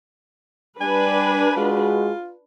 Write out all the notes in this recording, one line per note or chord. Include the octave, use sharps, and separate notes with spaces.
G3 D4 B4 G#5
G#3 F4 F#4